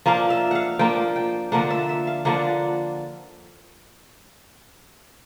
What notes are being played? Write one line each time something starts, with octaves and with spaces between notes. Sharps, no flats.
F3 A#3 D4 F5
E5
F5 F#5
F3 A#3 D4 G5
G5
D3 F3 A#3 D4 F#5
E5
E5
F5
D3 F3 A#3 D4 F#5